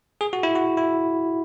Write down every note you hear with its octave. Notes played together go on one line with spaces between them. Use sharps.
G#4
F#4
E4
F#4
E4